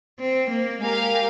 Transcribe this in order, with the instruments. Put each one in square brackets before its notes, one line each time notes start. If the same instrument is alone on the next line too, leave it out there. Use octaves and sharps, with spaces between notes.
[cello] C4
A#3
[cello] G#3 [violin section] G4 A#4 F5 G#5